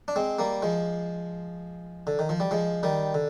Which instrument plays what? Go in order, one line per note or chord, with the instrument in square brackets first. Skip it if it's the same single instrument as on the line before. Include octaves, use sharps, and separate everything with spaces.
[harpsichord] D4
G#3 C4
G3 A#3
F3 G#3
D3
D#3
F3
G3
F3 G#3
D#3 G3
D3